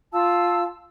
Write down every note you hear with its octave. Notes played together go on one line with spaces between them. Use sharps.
F4 F5 A5 E6